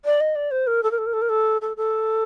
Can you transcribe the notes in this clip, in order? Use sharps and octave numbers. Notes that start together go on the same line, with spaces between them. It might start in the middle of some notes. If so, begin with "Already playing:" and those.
D5
D#5
D5
C5
A#4
A4
A#4
A4
A#4
A4
A#4
A4
A4
A4